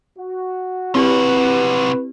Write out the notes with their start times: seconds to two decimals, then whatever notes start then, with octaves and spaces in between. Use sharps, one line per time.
0.17 F#4
0.95 C3 C4 E4 F#4 G4 B4